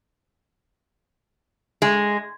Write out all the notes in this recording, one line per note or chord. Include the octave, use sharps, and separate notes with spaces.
G#3